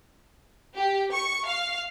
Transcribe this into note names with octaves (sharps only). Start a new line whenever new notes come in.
G4
C#6
F5